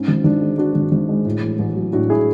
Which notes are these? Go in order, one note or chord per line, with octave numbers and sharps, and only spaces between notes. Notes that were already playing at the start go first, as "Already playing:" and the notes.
Already playing: G#2 C#4
G#1
G#1 D4
G#3
G#2 D4 F#4
G#1
G#1
G#3
A2
A1
A1
F#3
A2 D4 F#4
E4 G#4